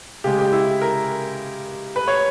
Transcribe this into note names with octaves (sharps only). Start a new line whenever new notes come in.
C#3 G#3 G4
G4
E4
A#4
B4
C#5